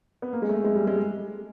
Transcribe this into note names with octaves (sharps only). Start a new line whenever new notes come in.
B3
A#3
G#3
A3
G#3
G3
G#3